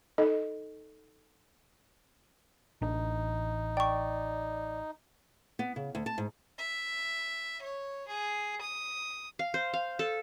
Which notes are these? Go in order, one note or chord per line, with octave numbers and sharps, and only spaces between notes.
D#4 A4 D#5
A1 D4 D#4
D5 G5 C#6
B3
C#3
D2
A5
G#2
E5
C#5
G#4
D#6
F5
C5
F5
A4